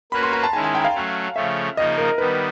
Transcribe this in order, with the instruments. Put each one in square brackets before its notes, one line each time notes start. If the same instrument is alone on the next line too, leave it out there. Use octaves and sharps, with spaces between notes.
[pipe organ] A#3 C#4 F#4 B4 [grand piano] B5
[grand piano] C6
A#5
A5
[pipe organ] D#3 G#3 C#4 E4 [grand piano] G#5
[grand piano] G#5
G5
F5
[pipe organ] F#3 A3 C#4
[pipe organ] C#3 F3 A3 C#4 [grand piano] E5
[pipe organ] C#3 F3 A#3 D#4 [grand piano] D#5
[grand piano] A#4
[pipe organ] D#3 G3 B3 [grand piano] B4